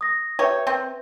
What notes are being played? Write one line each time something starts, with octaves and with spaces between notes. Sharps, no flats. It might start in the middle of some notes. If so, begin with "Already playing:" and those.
D#6 A#6
G4 B4 C#5 E5
C4